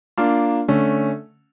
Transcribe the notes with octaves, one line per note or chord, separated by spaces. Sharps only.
A#3 D4 F4
D3 A3 C#4